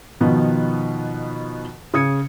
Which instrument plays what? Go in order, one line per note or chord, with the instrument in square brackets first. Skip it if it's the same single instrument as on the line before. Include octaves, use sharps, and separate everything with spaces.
[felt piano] B2 D#3 F3 B3
C#3 D#6 G#6 C#7